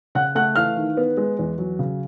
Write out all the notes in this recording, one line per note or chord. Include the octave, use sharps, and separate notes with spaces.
C#3 F#5 F#6
A3 F#5 F#6
E3 F5 F6
D#3
B3
G#3
E2
F#3
C#3